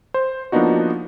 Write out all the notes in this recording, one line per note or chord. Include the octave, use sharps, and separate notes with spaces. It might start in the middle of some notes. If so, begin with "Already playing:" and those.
C5
F3 A#3 B3 D4 D#4 F#4